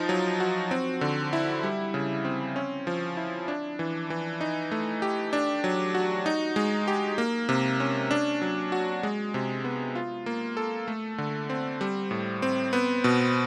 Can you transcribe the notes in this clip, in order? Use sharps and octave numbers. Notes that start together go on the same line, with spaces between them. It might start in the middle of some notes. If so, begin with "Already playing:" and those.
Already playing: F3 D#4
F#3
F#4
C4
D3
E4
G3
C#3
C4
C#4
F3
E4
D4
E3
E3
D#4
A3
G4
D4
F#3
F#4
D#4
G#3
G4
A#3
C3
C#4
D4
F#3
F#4
G#3
C3
B3
F4
A#3
A4
A3
D3
C4
G3
A2
C4
B3
B2